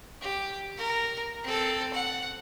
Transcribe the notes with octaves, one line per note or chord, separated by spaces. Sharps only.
G4
A#4
C4 A4
F#5